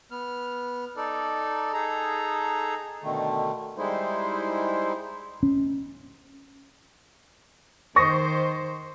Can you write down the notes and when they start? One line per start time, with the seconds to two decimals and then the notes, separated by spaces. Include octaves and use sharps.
0.11 B3 F6
0.96 D#4 A4 D5
1.73 D#4 G#4 A4 A#5
3.03 B2 D3 D#3 A3
3.78 G3 G#3 D#4 E4 C5
5.43 C#4
7.96 D#3 C5 C#6 D#6 A#6